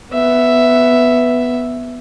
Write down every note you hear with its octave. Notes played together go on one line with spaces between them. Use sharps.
B3 E5